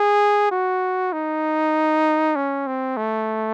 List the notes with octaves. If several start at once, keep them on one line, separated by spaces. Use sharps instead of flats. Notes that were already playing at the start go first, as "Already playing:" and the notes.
Already playing: G#4
F#4
D#4
C#4
C4
A3